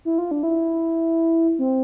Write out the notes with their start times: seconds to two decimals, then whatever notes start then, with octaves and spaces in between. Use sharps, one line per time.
0.05 E4
0.18 F4
0.31 D4
0.43 E4
1.59 C4